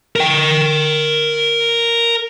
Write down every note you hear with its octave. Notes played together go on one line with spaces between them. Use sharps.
A#4 G5